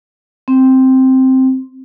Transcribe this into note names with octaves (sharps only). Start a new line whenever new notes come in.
C4